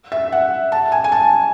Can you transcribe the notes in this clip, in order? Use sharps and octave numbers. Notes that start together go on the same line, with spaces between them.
E5
F#5
A5
G#5
G#5
A5